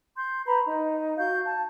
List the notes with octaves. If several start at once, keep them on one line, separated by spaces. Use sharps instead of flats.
C6 G6
B4 A#5 B5
D#4
F#4 F5 G6
A5